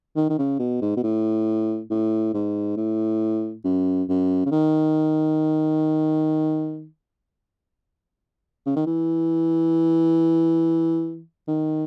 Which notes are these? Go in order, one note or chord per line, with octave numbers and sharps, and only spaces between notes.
D#3
D#3
C#3
B2
G#2
B2
A2
A2
G#2
A2
F#2
F#2
C#3
D#3
C#3
D#3
E3
D#3